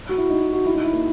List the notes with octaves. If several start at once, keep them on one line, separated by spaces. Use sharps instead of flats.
F#4
E4
D#4
E4
F#4
E4
D#4
E4
A#3